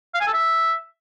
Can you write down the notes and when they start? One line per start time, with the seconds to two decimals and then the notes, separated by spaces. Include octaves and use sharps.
0.14 F5
0.21 G#5
0.27 A4
0.33 E5